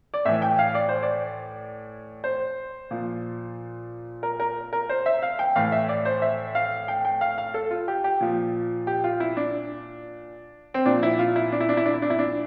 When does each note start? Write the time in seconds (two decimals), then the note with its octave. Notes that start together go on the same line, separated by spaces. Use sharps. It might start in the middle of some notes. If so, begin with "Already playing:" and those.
0.14 D5
0.25 A2 E3 E5
0.42 G5
0.59 F5
0.75 D5
0.89 C5
1.03 D5
2.24 C5
2.91 A#2 F3
4.23 A#4
4.40 A#4
4.73 A#4
4.89 C5
5.06 E5
5.22 F5
5.39 G5
5.55 A2 E3 F5
5.72 E5
5.89 D5
6.05 C5
6.22 E5
6.55 F5
6.88 G5
7.05 G5
7.21 F5
7.38 F5
7.54 A4
7.71 F4
7.88 G4
8.04 G4
8.21 A#2 F3
8.87 G4
9.04 F4
9.20 E4
9.37 D4
10.74 C4
10.86 A#2 F3 D4
11.03 E4
11.19 F4
11.36 E4
11.52 D4
11.60 E4
11.69 D4
11.77 E4
11.86 D4
11.94 E4
12.02 D4
12.10 E4
12.19 D4